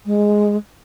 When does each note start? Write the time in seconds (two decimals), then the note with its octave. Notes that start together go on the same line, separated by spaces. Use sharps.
0.06 G#3